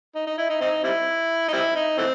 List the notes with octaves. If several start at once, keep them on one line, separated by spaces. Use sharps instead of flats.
D#4
D#4
E4
D#4
C4 D#4
G3 C4 E4
D#4
G3 C4 E4
D#4
E3 A3 C4